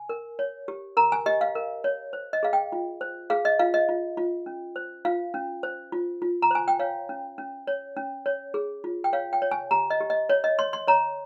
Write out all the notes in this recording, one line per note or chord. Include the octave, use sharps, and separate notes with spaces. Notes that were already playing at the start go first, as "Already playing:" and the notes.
Already playing: G#5
A#4
C#5
G4
A#4 A#5
G#5
G4 D#5
F5
A#4
C#5
C5
D#5
G#4 F5
G5
F4
C5
G#4 F5
D#5
F4 F5
D#5
F4
F4
C#4
C5
F4 F5
C#4
C5
F4
F4
A#5
C5 G#5
G5
C#5 F5
C#4
C#4
C#5
C#4
C#5
G#4
F4
G5
C#5 F5
G5
C#5
G#5
G4 A#5
D#5
G4
D#5
C#5
D#5
C#5 C6
C6
C#5 A#5